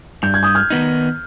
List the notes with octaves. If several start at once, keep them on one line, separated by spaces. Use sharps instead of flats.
G2 G6
G#6
D#6 G6
F6 G#6
D#3 B3 D#4